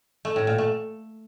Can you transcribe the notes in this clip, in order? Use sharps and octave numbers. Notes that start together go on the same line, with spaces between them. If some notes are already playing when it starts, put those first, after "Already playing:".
A3
A2
A#2
A3